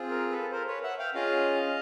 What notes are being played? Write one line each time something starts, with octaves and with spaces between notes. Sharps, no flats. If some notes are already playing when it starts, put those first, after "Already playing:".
Already playing: C4 F4 G#4
A#4
A4 B4
A#4 C5
B4 C#5
E5 F#5
F5 G5
C#4 F4 G#4 D#5 F5